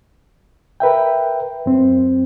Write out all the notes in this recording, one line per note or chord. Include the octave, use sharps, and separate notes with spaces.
A#4 B4 E5 G5
F#2 C4